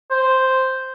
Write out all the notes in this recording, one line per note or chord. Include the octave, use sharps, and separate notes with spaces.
C5